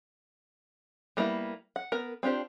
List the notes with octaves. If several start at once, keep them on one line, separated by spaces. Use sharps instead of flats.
G3 A#3 B3 E4
F#5
B3 A#4
C4 D4 F4 G4 C5